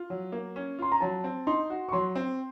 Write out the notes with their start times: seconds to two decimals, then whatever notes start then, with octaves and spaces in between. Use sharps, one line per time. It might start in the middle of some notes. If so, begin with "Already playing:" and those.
Already playing: F4
0.10 F#3
0.32 A#3
0.56 C#4
0.79 F4 C6
0.92 A#5
1.01 F#3 A5
1.24 C4
1.47 D#4 C6
1.70 F#4
1.89 C#6
1.92 F#3 C6
2.15 C4